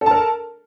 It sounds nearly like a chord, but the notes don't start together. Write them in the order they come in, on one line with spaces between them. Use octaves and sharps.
A4 A5 A#4